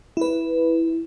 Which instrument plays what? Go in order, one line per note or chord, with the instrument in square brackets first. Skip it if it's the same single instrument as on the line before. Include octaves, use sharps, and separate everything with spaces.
[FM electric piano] E4 B4